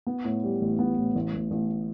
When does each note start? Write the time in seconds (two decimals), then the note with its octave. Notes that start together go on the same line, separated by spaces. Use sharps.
0.07 B3
0.24 A2
0.44 G3
0.61 A1
0.79 B3
0.97 A2
1.15 A1
1.34 A1
1.51 A1